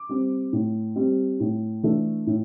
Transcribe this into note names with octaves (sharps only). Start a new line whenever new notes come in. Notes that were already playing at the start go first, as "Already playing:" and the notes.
Already playing: D6
G3 C4
A2
G3 C4
A2
E3 A3 D4
A2